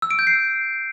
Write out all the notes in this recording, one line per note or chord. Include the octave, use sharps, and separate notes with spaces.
E6
D7
G6
C7